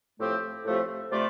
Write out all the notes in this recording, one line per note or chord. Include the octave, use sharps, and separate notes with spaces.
A2 F3 A3 C4 G4
A2 F3 A3 C4 G4
C3 A3 F4 D5